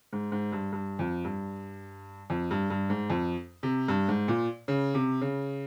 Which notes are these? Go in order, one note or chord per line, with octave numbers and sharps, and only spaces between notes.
G#2
G#2
G2
G2
F2
G2
F2
G2
G2
G#2
F2
C3
G2
G#2
A#2
C#3
C3
C#3